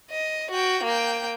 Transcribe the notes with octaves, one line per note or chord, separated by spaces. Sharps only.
D#5
F#4 G5
A#3 G5